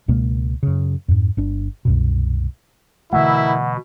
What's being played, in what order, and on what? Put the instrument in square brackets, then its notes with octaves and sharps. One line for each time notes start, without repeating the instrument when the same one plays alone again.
[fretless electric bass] C#2 B2 G#3 A#3
F#2 C#3
F2 G#2
G1 D4
C2 F#2 B2
[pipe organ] B2 [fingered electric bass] D3 E3 A3 [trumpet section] E4 A#4 E5 [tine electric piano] F#5